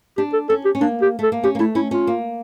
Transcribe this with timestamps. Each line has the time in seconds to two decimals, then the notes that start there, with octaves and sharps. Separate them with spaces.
0.17 D4 G4
0.33 A4
0.49 C#4 A4
0.65 G4
0.75 C#4
0.81 A#3 D4
1.02 G4
1.19 A3 A4
1.32 A#3
1.44 C#4 G4
1.55 A#3
1.59 A3 E4
1.75 C#4 E4
1.91 C#4 F4
2.07 A#3